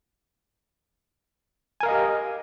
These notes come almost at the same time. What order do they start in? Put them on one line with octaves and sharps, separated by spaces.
G#5 A#4 F5 D#5 G4